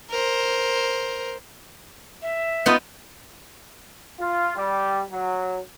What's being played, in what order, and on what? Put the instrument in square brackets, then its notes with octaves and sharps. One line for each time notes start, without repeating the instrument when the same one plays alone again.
[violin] A#4 C5
[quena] E5
[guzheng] B3 D#4 F4
[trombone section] F4
G3
F#3